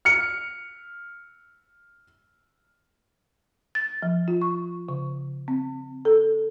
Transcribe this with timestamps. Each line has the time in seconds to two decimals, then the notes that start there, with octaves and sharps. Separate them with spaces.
0.05 F6 C#7
3.75 A6
4.02 F3
4.28 F4
4.42 C#6
4.89 C#3
5.48 C4
6.05 A4